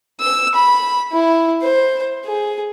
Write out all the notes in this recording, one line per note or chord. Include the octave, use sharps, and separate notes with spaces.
E6
B5
E4
C5
G#4